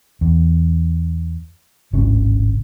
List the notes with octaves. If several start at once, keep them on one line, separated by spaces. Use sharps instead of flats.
E2
D1 G#1 C#3